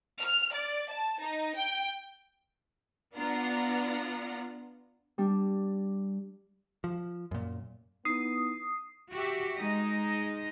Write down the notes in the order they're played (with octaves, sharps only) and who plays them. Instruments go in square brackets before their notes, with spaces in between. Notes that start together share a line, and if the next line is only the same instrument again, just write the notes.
[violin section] F6
D5
A5
D#4
G5
[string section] B3 D4 F4 F#5 A#5
[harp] G3 D4
[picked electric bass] F3
F#2 A#2
[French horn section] B3 [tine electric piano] D#4 E4 [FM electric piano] D#6 [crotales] C7
[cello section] F#4 G4 E5
G#3 D#4 D#5